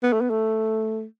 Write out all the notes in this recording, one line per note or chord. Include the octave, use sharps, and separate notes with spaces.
B3
A3
B3
A3